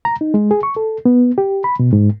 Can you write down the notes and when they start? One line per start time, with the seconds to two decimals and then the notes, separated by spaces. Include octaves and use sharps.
0.05 A#5
0.21 D#4
0.34 G#3
0.51 G#4
0.63 C#6
0.76 A4
1.05 B3
1.38 G4
1.64 B5
1.79 B2
1.93 G#2